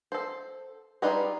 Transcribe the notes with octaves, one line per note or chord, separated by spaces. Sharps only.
A4 C5
G3 D#4 F4 G#4 B4